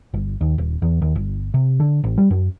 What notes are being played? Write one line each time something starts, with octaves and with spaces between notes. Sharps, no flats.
G1
D#2
D#1
E2
D#2
G1
C3
D3
A1
G3
F#2